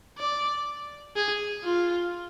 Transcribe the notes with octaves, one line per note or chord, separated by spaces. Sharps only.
D5
G#4
F4